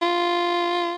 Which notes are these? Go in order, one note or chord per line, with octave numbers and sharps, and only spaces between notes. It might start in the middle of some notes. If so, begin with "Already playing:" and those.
F4